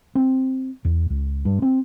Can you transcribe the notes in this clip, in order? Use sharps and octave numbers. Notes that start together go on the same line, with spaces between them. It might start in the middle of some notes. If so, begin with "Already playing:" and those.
C4
E2
C#2
G2
C4